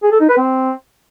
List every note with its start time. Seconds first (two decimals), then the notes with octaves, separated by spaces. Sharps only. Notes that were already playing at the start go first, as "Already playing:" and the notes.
0.03 G#4
0.12 A4
0.20 D#4
0.29 B4
0.38 C4